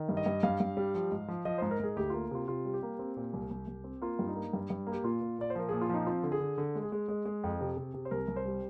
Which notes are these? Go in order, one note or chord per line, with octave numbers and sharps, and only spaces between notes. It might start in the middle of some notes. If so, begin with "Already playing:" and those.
Already playing: D#3
G2
D#5
G2
G2 F5
G2
G3
F3
G#2
F3
F3 D#5
G#2 C5
A#4
G#2 G#4
D2 G4
A#3 F4
C3 F4
C3 F4
G3
G4
A#3
C4
A#2
C2
C2
C2
C4
A#3 F4
G2
D#4
A#3
G2
G2
A#3
G4
A#2 F4
A#2
A#2 D5
C5
F3 A#4
A#2 G#4
F4
F3 D#4
C4 F4
D3
G#4
D3
D3
G#3
G#4
G#3
G#3
G#3
F2
C3
C3
C3
C5
C2 A#4
C2
C5
G3